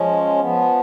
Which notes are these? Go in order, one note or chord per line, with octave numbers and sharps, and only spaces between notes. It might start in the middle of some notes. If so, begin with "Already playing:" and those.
Already playing: F3 G#3 C#4
F3 B3